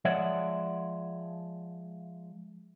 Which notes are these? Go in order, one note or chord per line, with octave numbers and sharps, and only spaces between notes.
F3 G#3 C#5 D5 E5 F#5